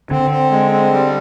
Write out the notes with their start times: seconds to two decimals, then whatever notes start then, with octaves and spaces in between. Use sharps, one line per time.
0.11 D3 C4
0.30 C4
0.51 G#3
0.72 C4
0.93 G3